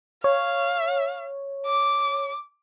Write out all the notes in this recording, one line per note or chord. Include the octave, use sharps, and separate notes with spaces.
C#5 F5
D6